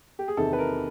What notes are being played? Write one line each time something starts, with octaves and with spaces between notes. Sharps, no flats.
G4
G#4
E2 C3 D#3 A4
B4
A#4